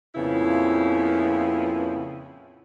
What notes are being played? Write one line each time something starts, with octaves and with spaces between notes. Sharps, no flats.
F2 A#2 C#3 B3 E4